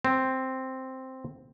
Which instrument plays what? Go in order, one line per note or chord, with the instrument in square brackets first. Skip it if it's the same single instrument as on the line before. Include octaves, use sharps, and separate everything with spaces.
[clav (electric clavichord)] C4